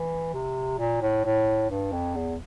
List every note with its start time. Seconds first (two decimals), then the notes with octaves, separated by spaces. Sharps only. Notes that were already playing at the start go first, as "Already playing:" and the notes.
Already playing: E3
0.33 C3
0.79 A#2
1.02 A2
1.25 A2
1.70 G2
1.92 F2
2.15 E2